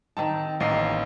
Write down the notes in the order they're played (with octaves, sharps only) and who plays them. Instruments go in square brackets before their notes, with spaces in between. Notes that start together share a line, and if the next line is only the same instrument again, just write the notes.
[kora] D#3 C4 D#4 [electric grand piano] A5
[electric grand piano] A1 D#5 C7 [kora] A#3